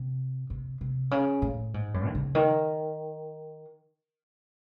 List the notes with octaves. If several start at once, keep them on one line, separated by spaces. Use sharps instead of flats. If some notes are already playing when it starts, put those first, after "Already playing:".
Already playing: C3
C3
C3
C#3
A2
G#2
F#2
D#3
C#3
D#3